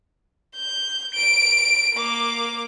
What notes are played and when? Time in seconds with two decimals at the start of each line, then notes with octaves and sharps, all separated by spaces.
0.55 G6
1.14 D7
1.94 A#3 D6